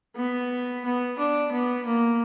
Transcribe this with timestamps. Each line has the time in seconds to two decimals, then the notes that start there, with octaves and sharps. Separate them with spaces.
0.16 B3
0.84 B3
1.18 D4
1.52 B3
1.85 A#3